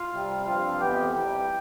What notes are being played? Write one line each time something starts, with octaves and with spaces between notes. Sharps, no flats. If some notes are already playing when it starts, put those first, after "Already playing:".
Already playing: F4 F5
C3 G3 C4
G2 F3 C4 F4 F5
F2 E3 B3 G4 G5
C3 E3 G3